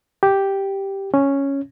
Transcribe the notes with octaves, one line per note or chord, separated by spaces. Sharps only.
G4
C#4